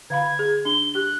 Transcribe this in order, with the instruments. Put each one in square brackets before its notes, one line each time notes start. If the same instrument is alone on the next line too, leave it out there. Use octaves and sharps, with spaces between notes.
[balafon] D3 F5 B5 [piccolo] G#6
[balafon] G#4
[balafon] D4 [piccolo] G7
[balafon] G4 [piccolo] F#6